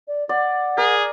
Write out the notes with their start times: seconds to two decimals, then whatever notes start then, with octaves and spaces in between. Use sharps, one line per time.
0.08 D5
0.29 D5 F#5
0.78 G#4 A#4